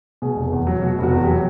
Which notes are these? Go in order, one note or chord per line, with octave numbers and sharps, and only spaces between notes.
B2 G#4
F1
E2
F#3
B2 F#4
F1
F#4
E2
F#3 G4